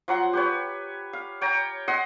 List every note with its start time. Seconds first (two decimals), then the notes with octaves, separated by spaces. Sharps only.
0.08 F3 F#3 F#5 C6
0.33 G4 B4 C#5
1.13 F5
1.41 C#5 G5 A#5
1.88 D#5 F#5 C6